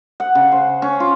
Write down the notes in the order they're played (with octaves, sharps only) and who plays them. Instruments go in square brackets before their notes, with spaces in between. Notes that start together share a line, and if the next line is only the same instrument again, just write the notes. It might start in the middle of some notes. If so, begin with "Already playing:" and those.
[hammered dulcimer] F#5
C#3
C5
C#4
F4